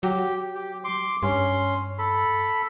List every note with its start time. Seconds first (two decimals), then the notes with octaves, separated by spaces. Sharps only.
0.03 F#3 G4
0.55 G4
0.84 C6 D6
1.23 G2 C#4 C6
1.98 A4 B5